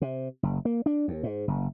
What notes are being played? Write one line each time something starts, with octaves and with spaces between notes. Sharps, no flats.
C3
F#1
A#3
D4
D#2
G#2
F#1